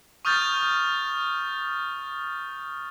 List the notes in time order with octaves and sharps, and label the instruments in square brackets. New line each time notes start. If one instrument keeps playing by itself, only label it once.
[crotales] C#6 D#6 F6 G6 A6